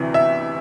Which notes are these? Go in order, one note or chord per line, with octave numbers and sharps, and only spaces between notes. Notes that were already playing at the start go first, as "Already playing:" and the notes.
Already playing: D2 C3 E3
E5